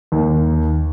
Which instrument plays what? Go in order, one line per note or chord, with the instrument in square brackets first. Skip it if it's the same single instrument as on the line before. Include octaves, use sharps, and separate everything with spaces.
[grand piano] D#2